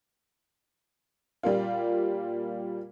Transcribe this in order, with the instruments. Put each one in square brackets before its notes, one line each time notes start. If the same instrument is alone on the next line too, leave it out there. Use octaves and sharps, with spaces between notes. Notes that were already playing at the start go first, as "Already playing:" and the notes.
[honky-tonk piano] A#2 G3 A#3 F4